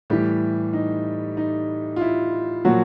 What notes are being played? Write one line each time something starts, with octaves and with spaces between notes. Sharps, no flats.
A2 E3 G3 G4
D#4
D#4
F4
E4
A#2 F3 F#3 F#4